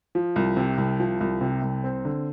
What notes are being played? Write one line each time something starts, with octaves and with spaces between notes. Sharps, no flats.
F3
C2
C3
C2
F3
C2
C3
C2
C4
D3